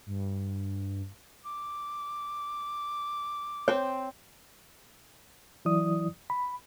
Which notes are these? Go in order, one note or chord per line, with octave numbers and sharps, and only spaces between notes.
G2
D6
C4 C5 C#5
E3 F#3 E4 D5 D#6
B5